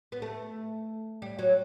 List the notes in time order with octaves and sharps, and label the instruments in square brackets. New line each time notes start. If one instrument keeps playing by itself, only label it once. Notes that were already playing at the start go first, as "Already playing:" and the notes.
[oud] B3
A3
G3
F#3